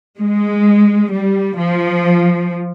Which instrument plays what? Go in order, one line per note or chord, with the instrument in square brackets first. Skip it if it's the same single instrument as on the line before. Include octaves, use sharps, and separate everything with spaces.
[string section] G#3
G3
F3